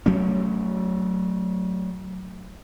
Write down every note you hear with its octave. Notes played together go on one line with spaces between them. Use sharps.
F#3 A3 C#4